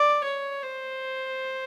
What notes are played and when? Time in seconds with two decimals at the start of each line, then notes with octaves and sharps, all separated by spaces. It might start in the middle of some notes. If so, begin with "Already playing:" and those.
Already playing: D5
0.24 C#5
0.63 C5